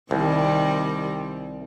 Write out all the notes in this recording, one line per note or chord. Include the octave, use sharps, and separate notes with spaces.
C2 D#3 G3 C4